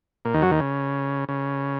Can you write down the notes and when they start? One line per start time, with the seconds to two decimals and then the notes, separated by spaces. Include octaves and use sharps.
0.25 A#2
0.34 D#2 D#3
0.42 F#2 F#3
0.51 D#2 D#3
0.60 C#3
1.29 C#3